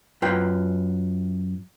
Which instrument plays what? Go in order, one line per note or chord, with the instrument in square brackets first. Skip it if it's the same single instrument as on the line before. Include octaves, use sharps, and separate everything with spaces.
[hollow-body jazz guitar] F#2 F4 B4 G5